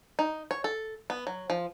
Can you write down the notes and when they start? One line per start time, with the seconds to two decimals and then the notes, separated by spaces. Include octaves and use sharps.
0.19 D#4
0.51 C#5
0.64 A4
1.10 B3
1.27 F#3
1.50 F3